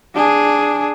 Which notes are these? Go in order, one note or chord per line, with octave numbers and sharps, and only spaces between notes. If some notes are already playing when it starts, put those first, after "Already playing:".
D4 G#4